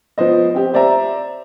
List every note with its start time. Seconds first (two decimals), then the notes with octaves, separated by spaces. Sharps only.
0.18 F3 B3 C5 D#5
0.54 C4 G4
0.74 C5 D5 E5 A#5